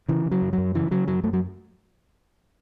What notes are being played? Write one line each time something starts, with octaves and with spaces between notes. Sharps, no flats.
C#3 E3
C#3
F#3
F#2
F#3
F#2
C#3 E3
C#3 F#3
F#2 F#3
F#2 A3
F#3